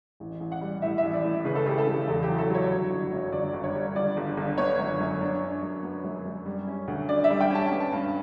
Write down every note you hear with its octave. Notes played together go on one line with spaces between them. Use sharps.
A1
A1
F#5
G3
A2 E5
E5
A1
D5
A2
C#3 B4
A4
C#3 G4
A4
C#3
E2 A4
G4
F#3
A4
F#3 C#5
G1
G1
F#2
G1 D5
G1
C#5
G3
G1 D5
G1
G1
B3 C#5
F#2
F#2
D4
D4
F#2
B3
F#2
F#2
G3
C#4
D2
D3 D5
E5
G3
G5
C#4 A5
B3
A5
G2